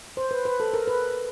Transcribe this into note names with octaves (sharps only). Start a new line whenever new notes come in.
C5
B4
B4
A4
A#4
B4